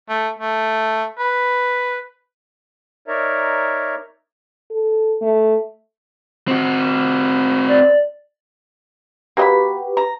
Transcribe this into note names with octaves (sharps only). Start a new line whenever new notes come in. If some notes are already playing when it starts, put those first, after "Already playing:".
A3
A3
B4
D#4 A#4 C#5 D5 E5 A#5
A4
A3
C4 F#4
D5
A#3 F#4 G4 B4 D#5 B5
A#5